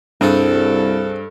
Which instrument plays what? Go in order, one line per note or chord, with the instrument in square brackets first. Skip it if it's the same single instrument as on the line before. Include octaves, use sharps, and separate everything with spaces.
[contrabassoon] C2 [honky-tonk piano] G2 [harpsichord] C4 G#4 C5 [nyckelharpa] A4